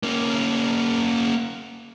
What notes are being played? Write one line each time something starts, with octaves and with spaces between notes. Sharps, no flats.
A#3 C#4